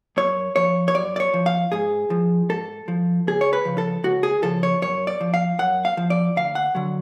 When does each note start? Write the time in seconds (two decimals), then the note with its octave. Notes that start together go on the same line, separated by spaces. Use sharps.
0.17 F#2 C#5
0.56 F3 C#5
0.88 C#5
0.95 F#2 D5
1.16 D5
1.20 C#5
1.34 F3
1.46 F5
1.72 G#2 G#4
2.10 F3
2.49 G#2 A4
2.88 F3
3.27 C#2 G#4
3.41 C#5
3.53 B4
3.65 C#3 F3
3.78 A4
4.04 C#2 F#4
4.23 G#4
4.43 C#3 F3 A4
4.63 C#5
4.82 F#2 C#5
5.07 D5
5.21 F3
5.34 F5
5.59 F#2 F#5
5.85 F5
5.97 F3
6.10 D5
6.36 D2 F5
6.55 F#5
6.75 D3 F#3